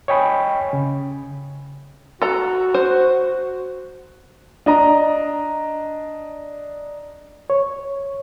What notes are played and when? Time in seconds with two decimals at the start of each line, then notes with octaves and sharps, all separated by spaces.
0.08 C#5 D#5 G5 G#5 B5
0.73 C#3
2.22 F#4 A4 A#5
2.74 C5
4.66 D4 D#5 A#5
7.50 C#5